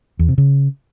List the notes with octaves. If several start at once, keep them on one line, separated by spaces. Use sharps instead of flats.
E2
C3
C#3